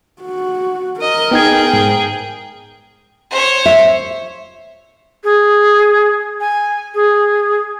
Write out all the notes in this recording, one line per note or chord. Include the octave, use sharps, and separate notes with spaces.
F#4
A#4 D#5
B3 D#4 G#4 G5 G#6
G#2
C5 C#5
E5
G#4
G#5
G#4